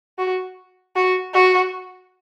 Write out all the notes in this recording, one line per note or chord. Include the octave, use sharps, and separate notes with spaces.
F#4
F#4
F#4